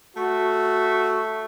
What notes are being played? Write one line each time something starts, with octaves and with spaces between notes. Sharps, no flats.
A3 F#4